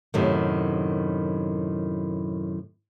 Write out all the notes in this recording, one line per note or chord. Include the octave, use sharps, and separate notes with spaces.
F#2 A2 C3 D#3